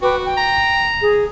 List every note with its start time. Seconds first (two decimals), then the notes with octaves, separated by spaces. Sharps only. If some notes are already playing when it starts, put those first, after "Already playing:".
0.01 F#4 B4 G5 D6
0.24 G5
0.37 A#5
1.00 G#4